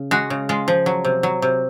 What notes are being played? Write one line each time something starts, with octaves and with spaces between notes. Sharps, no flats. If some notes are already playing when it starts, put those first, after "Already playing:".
Already playing: C#3
G#3 F#4
C#3
G#3 F4
F3
F#3
C3
F#3
C3